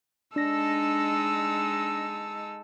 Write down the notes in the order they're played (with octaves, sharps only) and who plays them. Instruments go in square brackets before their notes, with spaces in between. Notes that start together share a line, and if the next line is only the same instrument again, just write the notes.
[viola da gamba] G#3 D#4 A4 [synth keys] D4 A#6 [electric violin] E6